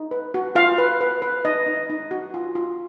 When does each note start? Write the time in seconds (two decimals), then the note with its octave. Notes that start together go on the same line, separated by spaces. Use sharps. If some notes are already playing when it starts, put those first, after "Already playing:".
Already playing: D#4
0.11 B4
0.34 F#4
0.55 F4 F5
0.78 B4
1.01 B4
1.22 B4
1.45 D#4 D#5
1.67 D#4
1.90 D#4
2.11 F#4
2.34 F4
2.55 F4